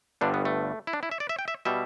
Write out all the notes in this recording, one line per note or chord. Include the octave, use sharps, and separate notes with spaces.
G1 G2 D3 G3 D4
B3
A3
E4
D4
E4
E5
D5
E5
G5
E5
B2 G3 E5